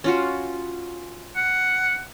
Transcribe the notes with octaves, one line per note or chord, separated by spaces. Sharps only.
C#4 F4 F#4
F#5